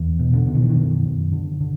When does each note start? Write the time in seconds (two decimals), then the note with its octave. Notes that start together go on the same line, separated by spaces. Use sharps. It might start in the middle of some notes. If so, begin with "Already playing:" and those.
Already playing: E2
0.19 B2
0.33 D3
0.47 B2
0.55 D#3
0.62 E3
0.70 D#3
0.76 F#2
1.04 F#2
1.32 D3
1.60 D3